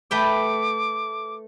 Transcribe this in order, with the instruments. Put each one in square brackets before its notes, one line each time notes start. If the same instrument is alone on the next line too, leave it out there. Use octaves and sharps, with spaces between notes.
[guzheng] A3 B4 G5 [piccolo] D6